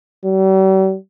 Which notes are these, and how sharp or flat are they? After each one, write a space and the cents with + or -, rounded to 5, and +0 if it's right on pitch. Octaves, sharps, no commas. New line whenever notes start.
G3 -45